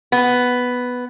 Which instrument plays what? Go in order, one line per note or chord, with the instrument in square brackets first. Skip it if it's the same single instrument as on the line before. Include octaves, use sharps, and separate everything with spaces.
[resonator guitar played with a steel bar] B3